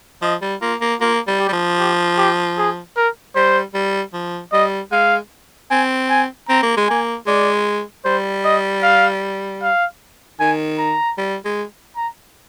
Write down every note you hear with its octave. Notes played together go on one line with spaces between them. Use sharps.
F3 D#5
G3
A#3 F4
A#3
A#3 F4
G3
G4
G3
F3
G4
G4
G#4
A#4
G3 C5
G3
F3
G3 D#5
G#3 F5
C4 G#5
G#5
C4 A#5
A#3
G#3
A#3 G#5
G#3 D5
G3 C5
D#5
F5
F5
D#3 G#5
A#5
G3
G#3
A#5